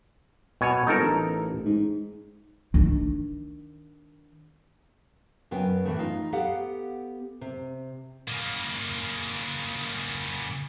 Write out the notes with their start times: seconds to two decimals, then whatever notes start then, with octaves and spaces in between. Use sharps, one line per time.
0.61 B2 C#5 G#5
0.87 G1 D#4 A4 A#4
1.01 A1
1.66 G#2
2.74 D#3 D4
5.51 F#2 C#3 B3 C#4 B4 G5
5.85 A2 E3 G#3 A3
5.99 D#4 F4
6.32 B3 G4 A4 F5 F#5
7.41 C3
8.28 C#3 A#3